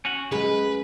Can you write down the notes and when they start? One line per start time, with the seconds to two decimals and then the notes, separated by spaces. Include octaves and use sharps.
0.05 C#4 F#4
0.32 F#2 G#3 B4